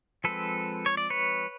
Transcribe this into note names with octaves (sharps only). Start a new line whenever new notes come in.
F3 G#3 C4 A4 B4
C#5
D5
B4 C#5